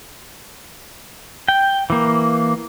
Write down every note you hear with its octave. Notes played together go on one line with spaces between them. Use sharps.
G5
E3 A#3